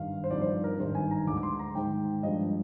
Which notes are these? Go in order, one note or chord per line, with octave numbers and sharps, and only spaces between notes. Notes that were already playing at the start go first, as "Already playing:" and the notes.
Already playing: G#1 G2 D#3 F5
C5
G2 F3 C4 D#4 D5
C5
D5
A#4
G#1 G2 D#3 C5
G#5
A#5
D2 D3 G#3 D6
D6
C6
A#5
G#2 D#3 G#3 G5
G2 F3 G#3 D4 D#5